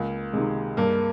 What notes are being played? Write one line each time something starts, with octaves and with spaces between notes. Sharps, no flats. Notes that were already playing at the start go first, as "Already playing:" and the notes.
Already playing: C#2 A#3
C3 D#3 G#3
G2 A#3